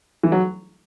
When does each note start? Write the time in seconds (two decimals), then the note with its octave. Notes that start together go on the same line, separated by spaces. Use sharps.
0.23 E3
0.32 F#3